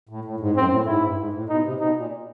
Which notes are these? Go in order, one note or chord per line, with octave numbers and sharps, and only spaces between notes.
A2
A2
G#2
F#2 C4
A2
G#2 E4
G2
G#2
A2
B2 D#4
C3
B2 D#4
A#2